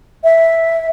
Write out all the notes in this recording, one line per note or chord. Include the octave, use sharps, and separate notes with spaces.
E5